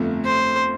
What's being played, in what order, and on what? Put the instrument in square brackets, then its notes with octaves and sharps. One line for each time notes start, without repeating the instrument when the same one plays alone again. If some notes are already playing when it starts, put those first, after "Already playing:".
Already playing: [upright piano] G1 F2 F3 A3
[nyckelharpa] C5